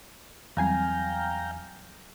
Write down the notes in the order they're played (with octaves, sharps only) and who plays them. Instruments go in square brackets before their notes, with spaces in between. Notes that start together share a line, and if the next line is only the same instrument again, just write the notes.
[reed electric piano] E2 G#5 [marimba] F#3 G3 C4 [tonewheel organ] F5 G5 A#5